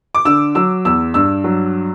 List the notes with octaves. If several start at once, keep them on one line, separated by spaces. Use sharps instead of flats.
D6
D3 E6
F#3 E6
E2 E6
G2 E6
F#3